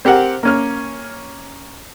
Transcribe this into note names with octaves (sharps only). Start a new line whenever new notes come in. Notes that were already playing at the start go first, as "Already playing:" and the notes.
C4 G4 A#4 F#5
A#3 C#4 F6